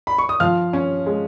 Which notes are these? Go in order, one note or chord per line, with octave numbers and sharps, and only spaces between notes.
B5
C#6
D#6
F3 F5 F6
C#4
G#3